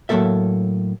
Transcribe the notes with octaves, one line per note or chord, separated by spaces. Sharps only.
A2 F#3 G#3 A#3 A4 E5